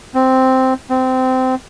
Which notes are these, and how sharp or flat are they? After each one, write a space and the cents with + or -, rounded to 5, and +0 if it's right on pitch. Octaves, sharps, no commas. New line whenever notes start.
C4 -5
C4 -20